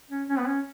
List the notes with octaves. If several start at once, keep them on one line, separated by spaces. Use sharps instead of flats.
C#4
C#4
B3
C#4